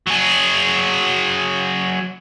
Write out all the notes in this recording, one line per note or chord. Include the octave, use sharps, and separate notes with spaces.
F#3 G#4